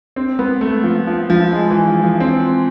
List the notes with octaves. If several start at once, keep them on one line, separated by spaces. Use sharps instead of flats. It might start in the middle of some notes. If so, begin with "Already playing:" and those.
C4
B3
A3
F3
F3
F3
G#3
E3
F3
F3
C4